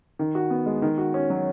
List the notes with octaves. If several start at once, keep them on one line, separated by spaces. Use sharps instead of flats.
D#3
F#4
B3
G#3
D#3
F#4
C#4
F#3